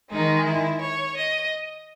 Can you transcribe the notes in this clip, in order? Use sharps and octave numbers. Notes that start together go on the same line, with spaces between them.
D#3 G#3 D#4
E4
C#5
D#5